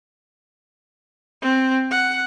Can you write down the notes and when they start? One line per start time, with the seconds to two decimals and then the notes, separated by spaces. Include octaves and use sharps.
1.42 C4
1.91 F#5